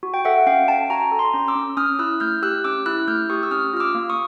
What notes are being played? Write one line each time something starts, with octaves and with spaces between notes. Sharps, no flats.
F#4
G5
A4 E5 F#5
C#4 F5 G5
C#4 G5 A5
F#4 G#5 A#5
A4
A#5 C6
C#4
D6 E6
C#4
C#4 D#6 F6
E4 E6 F#6
A3 F6 G6
G4 E6 F#6
C#4 D6 E6
E4 E6 F#6
A3 F6 G6
G4 C#6 D#6
E6
C#4 D#6 F6
F4 F6
D6 E6
A#3
C#6 D#6